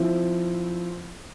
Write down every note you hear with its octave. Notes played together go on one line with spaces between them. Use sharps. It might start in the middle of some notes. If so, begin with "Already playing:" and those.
Already playing: F3 C4 E4